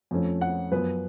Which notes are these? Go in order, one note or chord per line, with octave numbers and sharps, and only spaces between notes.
F2 F3 A3 C#4
F#5
F#2 F3 B3 B4